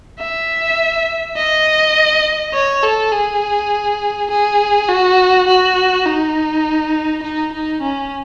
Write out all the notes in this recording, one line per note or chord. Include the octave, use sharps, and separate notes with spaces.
E5
D#5
C#5
A4
G#4
G#4
F#4
F#4
D#4
D#4
D#4
C#4